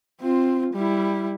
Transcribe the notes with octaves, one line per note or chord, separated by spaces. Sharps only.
C4 F4
G3 E4